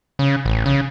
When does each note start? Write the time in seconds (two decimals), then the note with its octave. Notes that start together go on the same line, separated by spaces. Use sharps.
0.19 C#3
0.46 A1
0.66 C#3